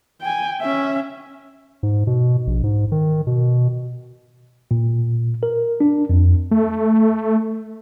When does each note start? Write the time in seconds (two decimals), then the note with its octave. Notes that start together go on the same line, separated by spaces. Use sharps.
0.21 G5 G#5
0.61 C#4 E5
1.83 G#2
2.07 B2
2.47 A#1
2.63 G#2
2.92 D#3
3.27 B2
4.71 A#2
5.43 A#4
5.81 D4
6.09 F2
6.51 A3